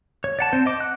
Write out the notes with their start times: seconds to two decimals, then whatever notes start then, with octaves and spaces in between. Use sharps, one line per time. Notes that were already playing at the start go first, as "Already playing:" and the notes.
0.24 C#5
0.39 D5 F#5 A5
0.53 C4 C5
0.66 D#5 D6
0.80 F#5 F#6